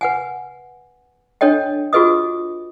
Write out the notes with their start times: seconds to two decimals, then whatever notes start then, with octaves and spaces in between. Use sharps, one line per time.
0.01 B4 F#5 G#5
1.41 D4 A4 C#5 D#5 G5
1.93 F4 F#4 G#4 B4 D#5 D#6